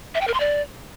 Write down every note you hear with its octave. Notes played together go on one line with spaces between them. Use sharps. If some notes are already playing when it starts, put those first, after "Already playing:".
E5
G5
A#4
C6
D5